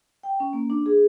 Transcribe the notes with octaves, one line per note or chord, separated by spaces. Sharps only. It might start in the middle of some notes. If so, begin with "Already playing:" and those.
G5
C#4
A#3
D4
G#4